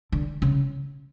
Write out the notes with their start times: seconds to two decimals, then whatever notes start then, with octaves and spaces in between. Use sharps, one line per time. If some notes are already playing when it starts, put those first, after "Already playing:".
0.12 D3
0.42 C#3